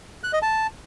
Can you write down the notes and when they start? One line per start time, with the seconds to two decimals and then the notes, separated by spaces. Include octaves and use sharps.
0.24 F#6
0.33 D#5
0.42 A5